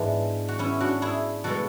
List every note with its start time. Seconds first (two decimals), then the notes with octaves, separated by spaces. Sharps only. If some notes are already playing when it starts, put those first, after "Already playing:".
Already playing: G#2 E3 G#3 B3 D4
0.48 F#4
0.59 C#4 E4
0.80 D4 F#4
1.02 E4 G#4
1.44 B2 G#3 B3 F#4 A4